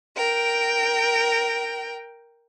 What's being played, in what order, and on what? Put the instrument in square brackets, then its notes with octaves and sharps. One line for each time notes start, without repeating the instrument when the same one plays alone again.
[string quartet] A#4 G5